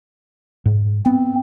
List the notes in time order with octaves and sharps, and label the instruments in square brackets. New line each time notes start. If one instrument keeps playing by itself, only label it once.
[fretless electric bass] G#2
[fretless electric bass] B3 [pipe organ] C4